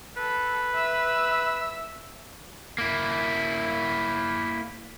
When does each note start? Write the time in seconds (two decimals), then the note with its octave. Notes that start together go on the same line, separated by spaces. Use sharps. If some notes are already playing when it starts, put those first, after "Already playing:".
0.17 A4 B4
0.74 E5 E6
2.78 A#3 E4